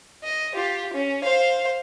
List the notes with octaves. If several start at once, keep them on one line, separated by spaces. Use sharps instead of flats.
D#5
F4 G4
C#4
C5 F5